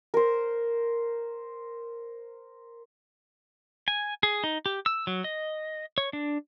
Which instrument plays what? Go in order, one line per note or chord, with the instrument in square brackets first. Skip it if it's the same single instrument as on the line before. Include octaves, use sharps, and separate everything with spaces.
[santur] A#4 C5
[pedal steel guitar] G#5
G#4
D#4
G4
E6
F#3
D#5
C#5
D4